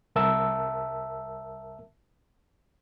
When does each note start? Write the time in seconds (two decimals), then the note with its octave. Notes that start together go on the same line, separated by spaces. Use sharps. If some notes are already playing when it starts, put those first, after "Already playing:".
0.16 C2 A#4 E5 A5 E6